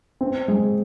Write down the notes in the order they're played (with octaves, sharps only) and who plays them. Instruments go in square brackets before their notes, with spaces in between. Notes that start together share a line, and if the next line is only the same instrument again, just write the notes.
[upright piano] C4
G#3